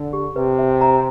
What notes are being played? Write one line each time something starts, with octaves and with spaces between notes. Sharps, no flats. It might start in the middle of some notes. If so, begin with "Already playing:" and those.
Already playing: D3
G4
C3 B4
E5
A#5